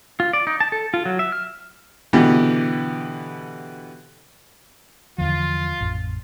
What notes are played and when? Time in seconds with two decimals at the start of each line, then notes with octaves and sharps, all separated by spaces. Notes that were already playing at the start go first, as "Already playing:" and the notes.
0.20 F4
0.33 D5
0.47 D#4
0.60 A5
0.72 A4
0.94 F4
1.06 F#3
1.19 E5
1.32 F6
2.13 B2 D3 E3 B3 G4
5.18 E2 D3 F3 F4
5.81 A1 F2